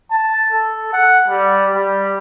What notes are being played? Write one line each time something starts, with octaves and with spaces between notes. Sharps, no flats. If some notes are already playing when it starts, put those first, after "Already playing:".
A5
A4
F#5
G3
G3